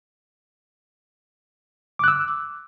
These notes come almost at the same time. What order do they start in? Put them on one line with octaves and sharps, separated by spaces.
D6 F#6 E6